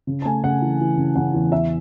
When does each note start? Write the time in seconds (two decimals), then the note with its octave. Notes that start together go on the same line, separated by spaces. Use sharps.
0.07 C#3
0.22 A5
0.25 A3 G#5
0.43 C#3 F#5
0.62 E3
0.80 E3
0.97 C#3
1.16 C#3 F#5
1.33 E2
1.52 E2 E5